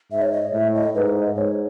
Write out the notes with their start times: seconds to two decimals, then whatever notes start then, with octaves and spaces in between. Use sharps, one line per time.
0.12 G#2 E5
0.22 C#5
0.32 D#5
0.53 A2 E5
0.75 D#5
0.95 G#2 B4
1.16 D#5
1.36 G#2 C#5